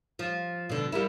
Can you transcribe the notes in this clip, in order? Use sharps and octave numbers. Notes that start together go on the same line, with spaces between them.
F3
B2 D3
G3 A#3 E4